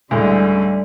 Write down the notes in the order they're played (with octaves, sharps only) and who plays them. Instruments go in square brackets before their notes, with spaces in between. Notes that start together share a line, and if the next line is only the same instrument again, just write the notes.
[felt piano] D2 A2 G#3 [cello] D3 G3